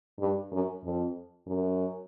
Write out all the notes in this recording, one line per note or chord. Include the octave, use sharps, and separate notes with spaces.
G2
F#2
F2
F#2